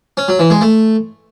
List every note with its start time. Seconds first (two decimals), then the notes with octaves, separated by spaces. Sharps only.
0.17 C#4
0.28 F#3
0.39 E3
0.50 G#3
0.61 A3